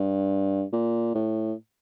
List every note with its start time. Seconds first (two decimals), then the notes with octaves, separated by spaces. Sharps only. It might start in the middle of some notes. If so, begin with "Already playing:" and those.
Already playing: G2
0.73 A#2
1.15 A2